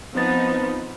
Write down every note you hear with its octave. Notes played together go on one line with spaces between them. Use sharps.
F3 B3 C4 D#4 C5 A6